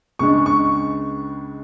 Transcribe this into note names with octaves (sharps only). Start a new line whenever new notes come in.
C#2 C#3 G#3 D4 C#6
C#6